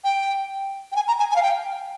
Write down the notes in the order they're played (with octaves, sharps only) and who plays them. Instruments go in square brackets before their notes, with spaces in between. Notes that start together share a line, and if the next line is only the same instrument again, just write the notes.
[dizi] G5
G5
G#5
A#5
G#5
G#5
F5
G5